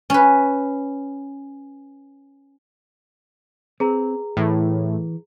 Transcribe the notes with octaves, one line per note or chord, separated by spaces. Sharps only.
C#4 B4
C4 G#4 B4 A#5
A2 E3